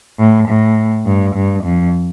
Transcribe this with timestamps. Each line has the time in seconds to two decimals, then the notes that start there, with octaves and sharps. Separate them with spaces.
0.19 A2
0.48 A2
1.06 G2
1.35 G2
1.64 F2